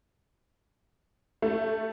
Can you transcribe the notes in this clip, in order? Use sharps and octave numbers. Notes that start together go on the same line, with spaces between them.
A3